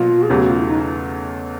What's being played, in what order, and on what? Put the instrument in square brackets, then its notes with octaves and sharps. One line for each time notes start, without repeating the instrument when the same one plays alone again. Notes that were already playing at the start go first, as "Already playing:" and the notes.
Already playing: [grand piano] B2 F#3 A#3 [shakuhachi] F4
[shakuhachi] G#4
[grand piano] E2 C#3 F#3 A3 [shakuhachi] G4
[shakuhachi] F#4
F4
E4
D#4